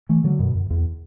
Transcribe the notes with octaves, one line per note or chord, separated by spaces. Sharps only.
E3 A3
D3 F#3
F#2 B2
F#2
E2